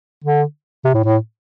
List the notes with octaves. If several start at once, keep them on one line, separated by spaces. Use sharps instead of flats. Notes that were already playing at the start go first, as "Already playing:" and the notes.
D3
C3
A2
A2